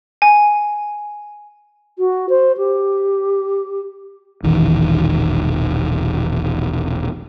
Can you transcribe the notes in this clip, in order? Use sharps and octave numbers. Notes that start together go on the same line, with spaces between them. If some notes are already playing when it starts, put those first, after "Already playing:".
G#5
F#4
C5
G4
E1 A#1 D#3 E3